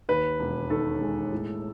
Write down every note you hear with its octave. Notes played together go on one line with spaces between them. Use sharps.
D#2 B4
E1
D#3 A4
G#3
A2